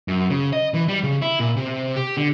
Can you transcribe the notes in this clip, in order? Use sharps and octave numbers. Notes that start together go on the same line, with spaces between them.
F#2
C#3
D#5
E3
G3
C#3
E4
A#2
C3
G4
D3